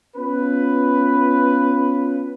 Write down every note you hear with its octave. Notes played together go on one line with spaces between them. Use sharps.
B3 C#4 F4 B4